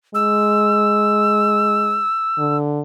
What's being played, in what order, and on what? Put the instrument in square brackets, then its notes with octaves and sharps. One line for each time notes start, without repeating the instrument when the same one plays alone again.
[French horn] G#3 [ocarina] E6
[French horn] D3